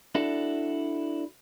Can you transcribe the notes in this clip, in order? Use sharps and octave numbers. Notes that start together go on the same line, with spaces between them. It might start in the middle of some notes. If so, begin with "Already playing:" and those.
D4 E4 F#4 A4